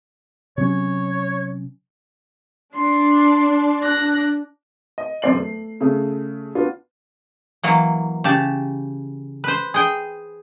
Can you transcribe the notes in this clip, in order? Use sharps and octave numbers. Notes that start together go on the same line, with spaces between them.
C3 F#3 C#4 C#5
D4 C6
F#6 A#6
D#5
E1 F#2 C5 D5 C7 F#7
A3
C#3 A3 D#6
B3 D4 F4 F#4
E3 F#3 A#3
C#3 G4 A5
B4 C5
G#4 G5